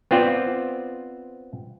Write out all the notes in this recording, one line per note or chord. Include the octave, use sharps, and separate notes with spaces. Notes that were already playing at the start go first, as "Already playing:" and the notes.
B3 C4 F4 C5 D5